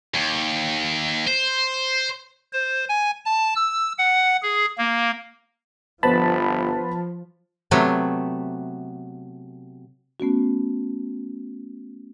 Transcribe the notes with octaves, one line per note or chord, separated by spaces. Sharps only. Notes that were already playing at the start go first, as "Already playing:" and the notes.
D#2
C5
C5
G#5
A5
E6
F#5
G#4
A#3
G1 F3 B3 B4 C5 A5 B5
C3 F#3 A3 B3
A3 B3 C#4 F#4